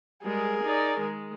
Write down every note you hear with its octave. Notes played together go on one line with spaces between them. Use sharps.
G3 G#3 G#4 A#4
D#4 D5
D#3 G#3